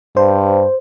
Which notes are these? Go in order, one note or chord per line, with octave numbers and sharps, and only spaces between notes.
G2 C5